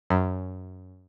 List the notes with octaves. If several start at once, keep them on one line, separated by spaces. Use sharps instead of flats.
F#2